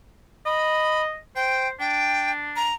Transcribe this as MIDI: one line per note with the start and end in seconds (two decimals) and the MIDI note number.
0.46 1.17 75
0.46 1.03 83
1.36 1.72 72
1.36 1.68 79
1.80 2.69 62
1.80 2.32 79
2.56 2.75 82